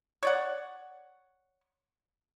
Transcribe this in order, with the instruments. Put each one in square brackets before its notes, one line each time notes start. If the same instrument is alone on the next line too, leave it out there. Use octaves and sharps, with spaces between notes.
[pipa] C#5 D5 F#5